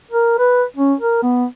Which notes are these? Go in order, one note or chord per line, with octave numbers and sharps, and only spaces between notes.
A#4
B4
C#4
A#4
B3